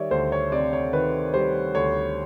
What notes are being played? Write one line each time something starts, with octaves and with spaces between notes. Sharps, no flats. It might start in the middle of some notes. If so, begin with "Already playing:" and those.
Already playing: D#3 G3 C#5 D5 E5
D2 C5
C#5
C3 D5
C#5
D#3 B4
G3 C5
D2 C#5